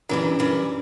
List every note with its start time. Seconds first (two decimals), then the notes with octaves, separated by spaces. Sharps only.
0.09 F#2 E3 G3 C#4
0.25 D4
0.39 F#2 E3 G3 D4